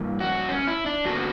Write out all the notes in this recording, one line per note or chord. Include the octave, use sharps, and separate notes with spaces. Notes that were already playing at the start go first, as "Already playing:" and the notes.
Already playing: G2 E3 A#3
F#4
C#4
E4
D4
E2 D3 A#3 F#4